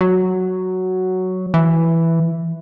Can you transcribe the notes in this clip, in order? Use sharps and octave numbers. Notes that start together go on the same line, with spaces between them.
F#3
E3